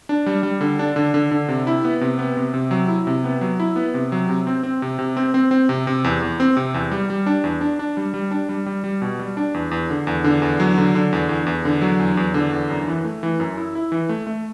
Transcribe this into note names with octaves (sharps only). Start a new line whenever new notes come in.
D4
G3
G3
D3
D4
D3
D3
D3
C3
E4
B3
C3
B3
C3
C3
F#3
E4
C3
B3
F#3
E4
B3
C3
F#3
C3
C4
C4
C3
C3
C4
C4
C4
C3
C3
E2
E2
C4
C3
E2
G3
G3
D4
E2
D4
D4
G3
G3
D4
G3
G3
G3
B2
G3
D4
E2
E2
D3
E2
D3
E2
F#3
D3
D3
E2
E2
E2
D3
F#3
E2
E2
D3
E2
F#2
E3
A3
E3
F#2
E4
E4
E3
A3
A3